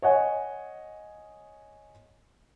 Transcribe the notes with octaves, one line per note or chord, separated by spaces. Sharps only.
C#5 D#5 F#5 G#5